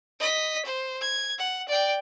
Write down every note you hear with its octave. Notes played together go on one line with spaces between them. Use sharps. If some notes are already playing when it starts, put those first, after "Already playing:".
D#5 B6
C5
G#6
F#5
D5 G5